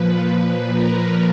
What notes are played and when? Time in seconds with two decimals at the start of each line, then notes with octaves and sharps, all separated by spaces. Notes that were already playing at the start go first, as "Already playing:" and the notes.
Already playing: A#2 F3 B4
0.73 A#4